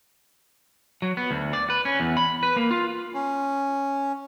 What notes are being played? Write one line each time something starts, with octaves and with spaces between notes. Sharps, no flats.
F#3
B3
D2
D5
B4
C#4
E2
B5
B4
A#3
F4
C#4